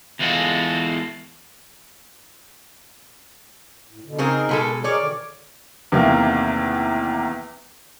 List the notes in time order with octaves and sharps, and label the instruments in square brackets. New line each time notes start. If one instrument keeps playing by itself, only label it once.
[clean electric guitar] E2 E3 G#3 F4 F#4 A4
[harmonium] A2
B2 D3
[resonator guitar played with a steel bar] C#3 C4 G#4 [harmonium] D#4 A#4
[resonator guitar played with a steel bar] B2 G#3 A4
[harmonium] D#4 G#4 A#4 [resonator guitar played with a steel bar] C#5 D5
[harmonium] B2 D3 D#3
[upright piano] E2 C3 D#3 A3 A#3